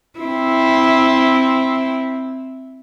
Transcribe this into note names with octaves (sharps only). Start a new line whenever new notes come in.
C4 E4